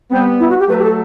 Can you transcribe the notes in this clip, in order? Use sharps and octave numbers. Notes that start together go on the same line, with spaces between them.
G3 B3 C4
E4
F#4
G4
F#3 A3 B4
G4
A4